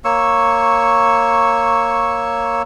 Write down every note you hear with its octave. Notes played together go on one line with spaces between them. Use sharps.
A#3 C#5 C#6 E6